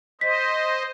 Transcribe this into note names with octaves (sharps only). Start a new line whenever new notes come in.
C5 D#5 B6